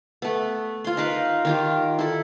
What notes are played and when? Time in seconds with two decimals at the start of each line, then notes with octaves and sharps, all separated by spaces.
0.22 A3 B3
0.84 F4 C6
0.97 D#4 A#4 B4 F5
1.45 D#3 F4 G4
1.99 E4 A4